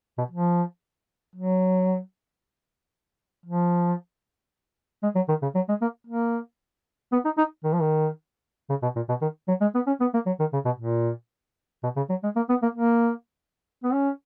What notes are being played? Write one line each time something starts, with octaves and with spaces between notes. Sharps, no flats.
B2
F3
F#3
F3
G#3
F#3
D#3
C#3
F#3
G#3
A#3
A#3
B3
D#4
D#4
D#3
F3
D#3
C#3
B2
A#2
B2
D#3
F#3
G#3
B3
C#4
B3
A#3
F#3
D#3
C#3
B2
A#2
B2
C#3
F#3
G#3
A#3
B3
A#3
A#3
B3
C#4